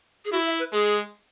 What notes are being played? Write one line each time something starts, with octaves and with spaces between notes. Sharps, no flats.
G#4
E4 F#4
E5
B4
G#3 G#4